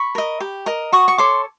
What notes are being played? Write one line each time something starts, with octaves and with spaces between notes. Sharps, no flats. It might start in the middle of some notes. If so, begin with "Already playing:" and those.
Already playing: B5 C#6
A#4 D#5
G4
A#4 D#5
F#4 C#6 D#6
C#6
A4 C#5 C6 D6